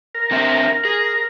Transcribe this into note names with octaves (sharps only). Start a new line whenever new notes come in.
A#4
D3 C4 E5
G#4